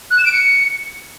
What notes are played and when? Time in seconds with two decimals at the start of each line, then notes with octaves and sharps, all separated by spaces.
0.11 F#6
0.18 E7
0.25 D7
0.33 C#7